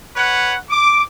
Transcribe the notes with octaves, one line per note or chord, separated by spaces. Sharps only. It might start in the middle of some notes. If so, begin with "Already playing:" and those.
B4 C#5 F#5
D6